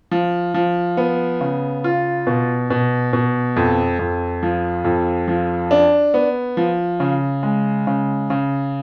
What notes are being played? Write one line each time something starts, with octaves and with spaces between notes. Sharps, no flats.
F3
F3
B3
C#3
F4
B2
B2
B2
F2
F2
F3
F2
F3
D4
B3
F3
C#3
G#3
C#3
C#3